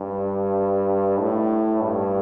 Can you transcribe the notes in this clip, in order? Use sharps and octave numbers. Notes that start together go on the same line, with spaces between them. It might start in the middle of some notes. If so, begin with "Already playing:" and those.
Already playing: G2
A2
G2